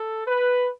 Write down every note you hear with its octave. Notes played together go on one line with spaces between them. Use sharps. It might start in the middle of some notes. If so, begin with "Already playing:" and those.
Already playing: A4
B4